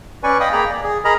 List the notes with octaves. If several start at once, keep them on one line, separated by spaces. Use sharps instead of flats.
C#4 B4 D5 G#5 C#6
D#5 F5 G5 B5 D#6
A#3 G#4 G5 A#5 B5
D5
G#4
G#4 A#4 D#5 A#5 B5